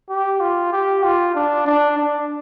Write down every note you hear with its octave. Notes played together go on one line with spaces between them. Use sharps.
G4
F4
G4
F4
D4
D4
D4